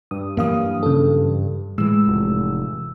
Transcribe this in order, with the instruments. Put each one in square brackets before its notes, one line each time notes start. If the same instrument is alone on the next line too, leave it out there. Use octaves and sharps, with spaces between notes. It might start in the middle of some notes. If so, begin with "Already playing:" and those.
[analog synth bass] G2 [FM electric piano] D#6
[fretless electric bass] F#2 E3 [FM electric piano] A#3 F5 D#6
[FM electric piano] C#3 A4
[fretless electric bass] A2 E3 [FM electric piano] G#3 E6
[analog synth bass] F1